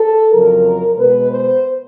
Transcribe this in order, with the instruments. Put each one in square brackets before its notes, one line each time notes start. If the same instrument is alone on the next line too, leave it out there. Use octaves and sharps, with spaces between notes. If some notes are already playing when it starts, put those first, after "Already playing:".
Already playing: [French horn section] A4
F2 C#3 F#3 A#4
B2 G#3 B3 B4
C5